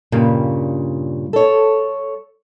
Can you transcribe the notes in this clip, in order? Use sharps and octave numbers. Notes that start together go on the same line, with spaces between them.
G2 A#2 C#3 G3
A4 C#5